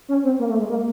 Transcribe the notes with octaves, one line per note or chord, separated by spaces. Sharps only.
C#4
C4
A#3
A3
G#3
A#3